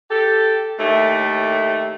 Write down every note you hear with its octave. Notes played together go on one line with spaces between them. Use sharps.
G4 A4
D#2 A2 A3